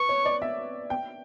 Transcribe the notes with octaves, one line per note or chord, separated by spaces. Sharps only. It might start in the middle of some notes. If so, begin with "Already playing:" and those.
Already playing: B4 C#6
C#5
D5
E5
G5